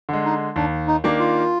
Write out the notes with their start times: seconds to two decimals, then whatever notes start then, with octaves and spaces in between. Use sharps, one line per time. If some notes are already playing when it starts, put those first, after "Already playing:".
0.09 D3 G#3
0.25 D#4
0.56 D#2 D4
0.87 D#4
1.04 D#3 A#3 D4
1.19 F4